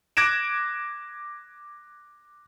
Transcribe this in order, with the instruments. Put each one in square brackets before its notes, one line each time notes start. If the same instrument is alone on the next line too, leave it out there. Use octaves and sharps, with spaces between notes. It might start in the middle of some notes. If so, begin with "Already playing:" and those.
[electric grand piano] D6 F#6 G#6 A#6 D7 E7